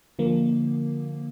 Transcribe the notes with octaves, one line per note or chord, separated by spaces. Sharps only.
D3 F3 A#3